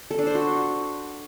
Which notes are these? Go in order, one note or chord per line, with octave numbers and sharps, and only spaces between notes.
A4
D4
C5
F#4